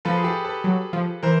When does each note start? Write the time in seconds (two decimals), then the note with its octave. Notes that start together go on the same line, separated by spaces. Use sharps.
0.05 F3 A4 B4
0.17 G#4
0.24 G4 A4
0.44 A4 B4
0.64 F#3
0.93 F3
1.23 E3 A#4 C5